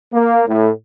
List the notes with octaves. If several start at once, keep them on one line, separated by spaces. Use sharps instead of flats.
A#3
A2